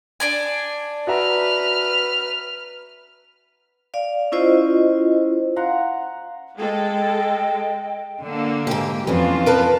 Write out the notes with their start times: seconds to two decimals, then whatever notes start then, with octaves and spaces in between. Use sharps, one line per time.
0.20 D4 D5 G#5
1.07 F#4 B4 E5 A#5 F6
3.94 D5 F5
4.32 C#4 E4 F4 C5 D#5
5.56 F5 F#5 A#5 C6
6.58 G#3 A4 D#5 G5
8.21 D3 A#3
8.67 G#2 G4
9.07 F2 E3 C#4 F4
9.46 A#4 B4 A5